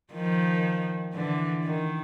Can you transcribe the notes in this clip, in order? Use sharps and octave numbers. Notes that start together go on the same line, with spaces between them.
D#3 F3
D3 E3
D#3